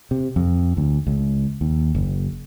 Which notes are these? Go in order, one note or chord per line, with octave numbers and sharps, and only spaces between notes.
C3
F2
D2
C#2
D#2
F#1